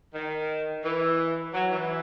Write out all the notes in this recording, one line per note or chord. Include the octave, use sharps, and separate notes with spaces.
D#3
E3
F#3
E3